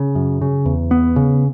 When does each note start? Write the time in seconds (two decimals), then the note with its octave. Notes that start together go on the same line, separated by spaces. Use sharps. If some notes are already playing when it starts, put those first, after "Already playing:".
Already playing: C#3
0.15 F#2
0.41 C#3
0.66 E2
0.91 B3
1.16 C#3